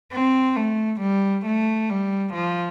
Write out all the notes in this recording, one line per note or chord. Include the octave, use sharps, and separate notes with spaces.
C4
A3
G3
A3
G3
F3